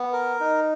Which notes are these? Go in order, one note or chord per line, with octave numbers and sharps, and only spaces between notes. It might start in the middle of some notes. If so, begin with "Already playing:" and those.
Already playing: B3
A#4
D#4